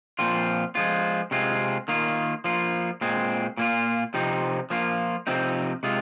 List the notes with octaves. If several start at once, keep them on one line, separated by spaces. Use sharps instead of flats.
A#2 F3 C4 F4
F3 G#3 F4
C3 G#3 C4 F4
D#3 A#3 F4
F3 A#3 F4
A#2 G#3 C4
A#2 A#3 F4
C3 F3 C4 D#4
F3 A#3 F4
C3 F3 C4 D#4
C3 G#3 F4